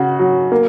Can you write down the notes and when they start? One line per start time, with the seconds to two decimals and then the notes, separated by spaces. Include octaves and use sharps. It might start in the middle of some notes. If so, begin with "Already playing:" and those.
Already playing: C#3 F#4
0.19 F#3
0.52 A#3